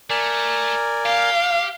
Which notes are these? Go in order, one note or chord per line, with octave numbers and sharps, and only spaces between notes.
A3 A#4 D5 G#5
G4 F5